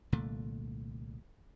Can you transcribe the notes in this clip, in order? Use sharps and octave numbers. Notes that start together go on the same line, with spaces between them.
C2 A#2 D3 A3